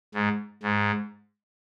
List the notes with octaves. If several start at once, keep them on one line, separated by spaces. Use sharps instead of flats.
G#2
G#2